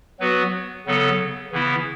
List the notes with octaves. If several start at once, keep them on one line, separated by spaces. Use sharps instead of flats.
F#3 B3 F#4 B4
C#3 F#3 B3 A4
C#3 E3 B3 E4